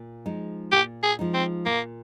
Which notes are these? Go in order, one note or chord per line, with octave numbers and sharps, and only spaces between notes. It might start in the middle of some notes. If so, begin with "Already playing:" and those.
Already playing: A#2
F3 G#3 D#4
A#2 G4
G#4
F3 G#3 D#4
C4
A#2 A#3